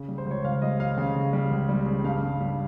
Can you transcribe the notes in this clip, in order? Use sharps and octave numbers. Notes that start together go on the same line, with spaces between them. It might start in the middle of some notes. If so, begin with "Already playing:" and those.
Already playing: C#3
G3
C5
C#2 C#5
C#2 F5
G3 D#5
G3 F5
C#3
C#3
G3
C#2
G3
C#3
G2 F5
G2
G3